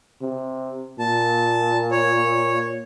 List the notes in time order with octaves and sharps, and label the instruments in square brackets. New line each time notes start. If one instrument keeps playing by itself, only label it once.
[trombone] C3
[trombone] A#2 [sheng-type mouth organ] A5
[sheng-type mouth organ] C#5